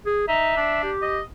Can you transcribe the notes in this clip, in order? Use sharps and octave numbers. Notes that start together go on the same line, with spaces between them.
G#4
D#4 E5
D4
G4
D#5